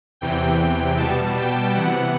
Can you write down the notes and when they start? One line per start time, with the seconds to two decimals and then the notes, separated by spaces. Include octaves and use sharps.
0.21 E2 C3 E3 G5
0.98 B2 G3 B3 A5
1.37 G5
1.75 C3 E3 B3 F#5